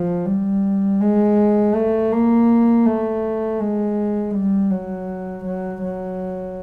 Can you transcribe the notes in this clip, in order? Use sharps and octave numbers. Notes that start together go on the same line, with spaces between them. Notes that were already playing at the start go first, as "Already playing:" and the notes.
Already playing: F3
G3
G#3
A3
A#3
A3
G#3
G3
F#3
F#3
F#3